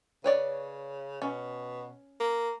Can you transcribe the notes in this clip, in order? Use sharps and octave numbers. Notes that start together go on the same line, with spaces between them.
C#3 B4 C#5 D5
B2 C#4
A#3